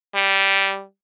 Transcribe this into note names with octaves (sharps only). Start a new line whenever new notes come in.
G3